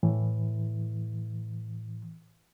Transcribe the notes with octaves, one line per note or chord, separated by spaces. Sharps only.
A2 E3